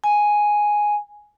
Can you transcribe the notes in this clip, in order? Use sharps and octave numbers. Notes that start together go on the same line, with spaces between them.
G#5